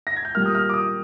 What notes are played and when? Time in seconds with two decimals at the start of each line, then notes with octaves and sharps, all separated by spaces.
0.07 A#6
0.16 G#6
0.25 G6
0.35 A#2 G3 A#3 F6
0.46 D#6
0.55 F6
0.69 D6
0.74 D#6